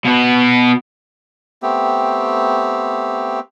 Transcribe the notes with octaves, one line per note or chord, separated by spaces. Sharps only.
B2 B3
A3 B3 C4 G4